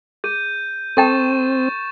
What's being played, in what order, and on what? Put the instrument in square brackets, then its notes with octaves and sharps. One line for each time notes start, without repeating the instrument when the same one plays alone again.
[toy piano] G#4 [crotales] G6 D#7
[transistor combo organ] C4 [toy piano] A4 G5 A5 [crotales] C#6 A6 E7